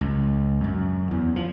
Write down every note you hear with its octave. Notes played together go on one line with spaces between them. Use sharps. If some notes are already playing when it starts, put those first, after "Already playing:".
C#2
F#2
E2
F3